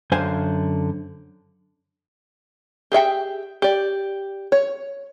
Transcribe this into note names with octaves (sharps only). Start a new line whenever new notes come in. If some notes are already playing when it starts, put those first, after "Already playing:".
F#2 D3 C5 F5 G#5
G4 G#4 E5 G5
G4 D5
C#5